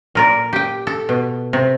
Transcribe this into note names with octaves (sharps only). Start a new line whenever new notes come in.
A#2 A#4 D5
G4 G5
A4
B2
C3